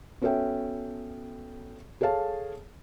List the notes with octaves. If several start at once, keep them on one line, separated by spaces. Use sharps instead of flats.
B3 C#4 F#4 A4 E5 G5
G#4 A4 C#5 F5 A5